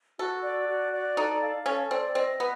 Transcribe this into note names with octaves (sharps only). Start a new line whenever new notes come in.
F#4 A4
D5
F#4
D5
D#4 A4
F5
C#4 A4
C4 D5
C4 D#5
B3 B4